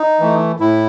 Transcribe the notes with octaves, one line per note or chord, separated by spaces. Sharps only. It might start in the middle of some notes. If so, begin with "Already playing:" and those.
Already playing: D#4
E3 A3
A2 E4